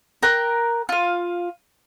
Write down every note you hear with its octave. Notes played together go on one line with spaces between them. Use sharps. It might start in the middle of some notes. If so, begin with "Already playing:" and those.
A#4 G5 F#6
F4 F5